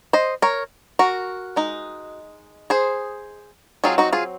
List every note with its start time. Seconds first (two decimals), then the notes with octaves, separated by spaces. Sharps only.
0.13 C5 D#5
0.42 A#4 C#5
0.99 F#4 A#4
1.56 G#3 D#4
2.70 G#4 C5
3.84 F#3 C4 D#4 F4 G#4
3.98 D#4 F#4
4.13 F4 G#4